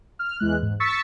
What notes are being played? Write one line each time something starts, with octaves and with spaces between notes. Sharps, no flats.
F6
E2 E3 G#3 F#6
G#2
C#6 E6 A6 B6 C#7